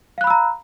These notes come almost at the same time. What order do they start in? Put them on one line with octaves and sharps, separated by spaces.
F5 F#6 B5 E6 A#5